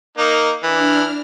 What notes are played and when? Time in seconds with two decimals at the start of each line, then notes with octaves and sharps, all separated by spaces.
0.18 A#3 D#4
0.63 E3 D4 F6